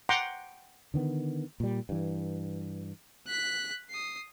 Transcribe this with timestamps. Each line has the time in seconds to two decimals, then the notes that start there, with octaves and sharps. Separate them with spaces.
0.09 F#5 G5 A#5 C6 D6
0.94 D3 D#3 B3
1.60 A#2 G3
1.89 G2 E3
3.27 F#6 B6
3.90 D#6 C7